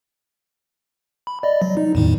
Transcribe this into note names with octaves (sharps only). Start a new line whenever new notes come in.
B5
D5 D#5
F#3
D#4
E2 A2 D#3